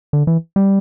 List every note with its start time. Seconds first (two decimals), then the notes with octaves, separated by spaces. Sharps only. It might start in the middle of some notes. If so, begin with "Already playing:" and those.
0.13 D3
0.27 E3
0.56 G3